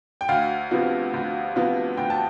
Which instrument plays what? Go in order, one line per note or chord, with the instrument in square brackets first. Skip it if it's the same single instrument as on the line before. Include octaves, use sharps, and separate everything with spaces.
[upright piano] G5
D2 F5
C3 F3 B3
D2
C3 F3 B3
D2 G5
A5